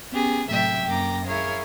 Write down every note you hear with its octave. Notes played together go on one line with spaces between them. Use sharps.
B3 C#4 G4 G#4
A2 C3 F#3 A3 E5 G5
F#2 A#3 G5 A#5 D6 A#6
E4 G#4 A#4 C#5 F5